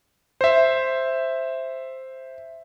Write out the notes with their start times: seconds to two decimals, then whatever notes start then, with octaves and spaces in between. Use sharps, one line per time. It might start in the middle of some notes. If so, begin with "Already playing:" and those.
0.41 C5 E5